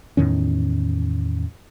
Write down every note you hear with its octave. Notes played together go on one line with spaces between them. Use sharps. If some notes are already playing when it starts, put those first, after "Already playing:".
E2 A2 D#3 C#4